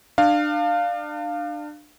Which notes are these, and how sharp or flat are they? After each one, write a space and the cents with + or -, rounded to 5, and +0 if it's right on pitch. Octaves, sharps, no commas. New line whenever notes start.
D4 +30 F5 +0